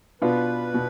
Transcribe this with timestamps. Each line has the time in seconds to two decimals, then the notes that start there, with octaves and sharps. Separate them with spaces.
0.22 B2 B3 D4 F4 B4
0.74 B2